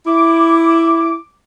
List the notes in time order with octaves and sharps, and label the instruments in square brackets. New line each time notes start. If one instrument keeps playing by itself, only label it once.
[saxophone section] E4 [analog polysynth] D6